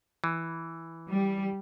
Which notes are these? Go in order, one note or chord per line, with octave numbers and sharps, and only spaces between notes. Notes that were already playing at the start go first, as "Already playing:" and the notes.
E3
G3